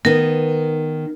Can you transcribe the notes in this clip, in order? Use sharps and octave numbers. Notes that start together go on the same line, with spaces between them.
D#3 B3 A#4